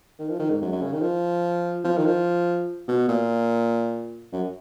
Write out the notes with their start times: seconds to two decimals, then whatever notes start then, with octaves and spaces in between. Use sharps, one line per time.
0.19 D#3
0.30 F3
0.39 D#3
0.50 G#2
0.61 F#2
0.72 F#2
0.82 C#3
0.92 D#3
1.01 F3
1.84 F3
1.98 D#3
2.06 F3
2.88 B2
3.08 A#2
4.32 F#2